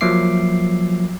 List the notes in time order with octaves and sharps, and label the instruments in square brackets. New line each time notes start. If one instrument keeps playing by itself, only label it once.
[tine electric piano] F3 F#3 A#3 E5 D6 C7